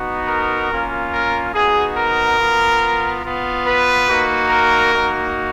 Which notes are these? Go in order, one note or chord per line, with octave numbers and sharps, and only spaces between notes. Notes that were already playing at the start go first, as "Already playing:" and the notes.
Already playing: B3 D#4 F#4
A#4
A#3 C#4 F4
A#4
B3 D#4 F#4 G#4
A#4
B3 F4
B3 F4
B4
A#3 D#4 F#4
A#4
A#3 D#4 F#4